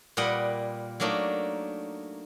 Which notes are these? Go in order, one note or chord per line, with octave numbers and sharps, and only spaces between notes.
A#2 G3 B4 D#5 F#5
F#3 A3 A#3 D4 D#4